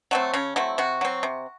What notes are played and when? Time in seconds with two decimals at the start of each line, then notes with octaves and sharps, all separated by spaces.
0.11 F#3 A3 C4
0.34 C#3 C#4
0.56 F#3 A3 C4 E4
0.78 C3 F#4
1.01 F#3 C4
1.23 C3